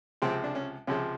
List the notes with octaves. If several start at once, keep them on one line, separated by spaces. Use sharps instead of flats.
C#2 C3 F3 G#3 C4
D4
C#4
C#2 C3 F3 G#3 C#4